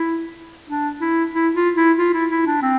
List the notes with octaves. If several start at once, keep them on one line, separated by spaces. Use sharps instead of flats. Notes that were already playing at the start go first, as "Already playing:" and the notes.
Already playing: E4
D4
E4
E4
F4
E4
F4
E4
E4
D4
C4